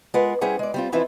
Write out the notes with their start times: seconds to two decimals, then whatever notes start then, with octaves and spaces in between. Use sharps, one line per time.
0.14 G#3 F4 A#4 B4 F#5
0.41 G3 C#4 E4 G#4 C5 F#5
0.59 G#3 D5
0.74 G3 C4 F4
0.92 F2 E3 C4 E4 F4 B4